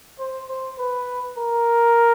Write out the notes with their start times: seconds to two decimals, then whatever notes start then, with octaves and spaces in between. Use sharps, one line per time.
0.19 C5
0.49 C5
0.79 B4
1.38 A#4